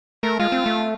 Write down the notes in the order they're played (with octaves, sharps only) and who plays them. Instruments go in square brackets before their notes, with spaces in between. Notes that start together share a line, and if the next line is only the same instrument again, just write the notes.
[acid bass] A3 [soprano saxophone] A#4
[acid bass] G#3 [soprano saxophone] F4
[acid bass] C4
A3